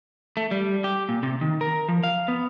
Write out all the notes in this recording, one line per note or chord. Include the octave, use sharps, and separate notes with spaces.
A3
G3
G4
A#2
C3
D#3
A#4
F3
F5
B3